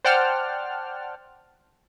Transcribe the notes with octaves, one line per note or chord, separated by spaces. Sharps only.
C5 D5 F#5 G5 A5 F6